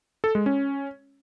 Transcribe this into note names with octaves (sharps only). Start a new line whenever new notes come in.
A4
G#3
C#4